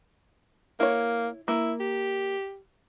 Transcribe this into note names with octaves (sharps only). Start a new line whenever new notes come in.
A#3 E4 C#5
A#3 E4
G4